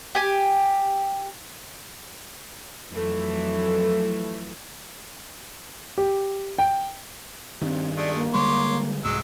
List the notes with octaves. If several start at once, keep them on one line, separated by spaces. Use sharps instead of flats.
G4 G#5
F2 E3 F#3 A3
G4
G5
G2 D#3 C4
G#3 A3 D5
A#3
D3 G3 G#3 C#5 C6 D6
C2 G#2 F#3 G#3 E6